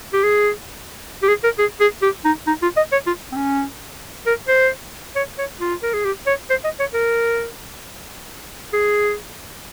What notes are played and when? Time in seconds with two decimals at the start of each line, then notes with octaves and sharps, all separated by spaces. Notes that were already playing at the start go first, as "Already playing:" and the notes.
0.13 G4
0.24 G#4
1.23 G4
1.28 G#4
1.44 A#4
1.59 G#4
1.80 G#4
2.02 G4
2.25 D#4
2.47 D#4
2.62 F4
2.77 D#5
2.92 C#5
3.07 F4
3.32 C4
3.36 C#4
4.26 A#4
4.48 C5
5.16 C#5
5.38 C#5
5.60 F4
5.83 A#4
5.93 G#4
6.05 G4
6.27 C#5
6.50 C5
6.64 D#5
6.80 C#5
6.94 A#4
8.73 G#4